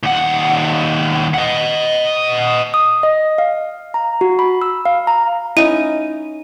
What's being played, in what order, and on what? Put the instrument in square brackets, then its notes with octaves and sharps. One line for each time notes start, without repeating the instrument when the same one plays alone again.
[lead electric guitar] D#2 F#5
D#5 F#5
[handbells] D#6
D#5
F5
A#5
F#4
B5
E6
F5
A#5
[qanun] C#4 D#4 [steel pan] E4 [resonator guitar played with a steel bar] D#5 [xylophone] D#7